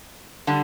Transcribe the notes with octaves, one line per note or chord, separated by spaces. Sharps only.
D3 G3